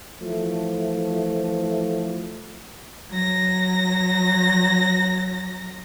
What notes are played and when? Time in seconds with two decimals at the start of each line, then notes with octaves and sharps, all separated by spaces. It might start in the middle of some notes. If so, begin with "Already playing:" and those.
0.21 E3 F3 A3
3.08 F#3 A#6